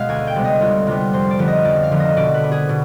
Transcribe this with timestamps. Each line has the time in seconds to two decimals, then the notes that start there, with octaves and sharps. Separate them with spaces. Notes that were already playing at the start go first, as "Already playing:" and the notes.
Already playing: B2 G#3 B3 F5
0.09 D2 G#5
0.27 G5
0.36 C3 G3 B3
0.44 D#5
0.60 D2 F4
0.87 C3 G3 B3 F4
1.00 F4
1.13 F2 C5
1.31 D5
1.39 D3 F3 B3
1.48 D#5
1.65 F2 D5
1.83 F5
1.91 D3 F3 B3
2.00 D#5
2.17 B2 D5
2.34 B4
2.44 B3
2.52 G#4
2.69 B2